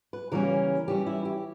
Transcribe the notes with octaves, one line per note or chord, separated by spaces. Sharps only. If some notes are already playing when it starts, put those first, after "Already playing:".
B4
C#3 E3 G3 A#3 C#4 A#4
E3 G3 C#4 G4
E4
G4